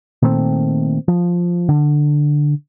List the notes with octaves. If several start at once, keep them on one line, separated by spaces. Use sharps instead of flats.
A#2 D#3 A3 C4
F3
D3